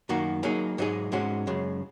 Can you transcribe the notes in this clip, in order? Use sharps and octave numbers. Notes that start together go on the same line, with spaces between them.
F#2 D#3 A#3 F#4
F#3 A#3 D#4 G#4
G#2 F#3 D#4 G#4
G#2 G#3 C#4 F#4
F#2 C#3 G#3